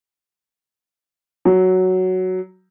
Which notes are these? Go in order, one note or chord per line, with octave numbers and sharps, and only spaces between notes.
F#3